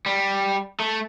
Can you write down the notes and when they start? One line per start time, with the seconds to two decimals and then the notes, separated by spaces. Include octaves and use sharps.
0.06 G3
0.80 A3